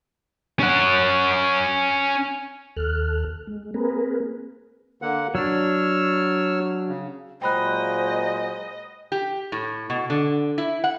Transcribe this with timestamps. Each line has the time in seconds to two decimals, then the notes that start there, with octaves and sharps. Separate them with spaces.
0.60 C#4 F#5
2.76 D#2 A4 F6 F#6
3.47 G#3
3.74 A#3 C4 G#4 A#4 B4
5.02 D3 A#3 F#5
5.35 F#3 D4 C#5 E6 F6
6.88 C#3
7.42 A#2 F#3 G#3 C5 D#5 G5 B5 F#6
9.12 G4
9.52 A2
9.90 B2
10.10 D3
10.58 E4
10.84 F#5